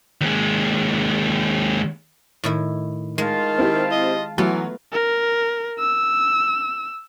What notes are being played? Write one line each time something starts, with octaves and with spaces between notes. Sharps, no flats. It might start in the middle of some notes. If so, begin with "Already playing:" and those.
D#2 G#3
A2 D#3 E4
D#3 G#3 F4 F5 A5
C4 E4 G4
D#5
E3 F#3 A3 B3 F4
A#4
E6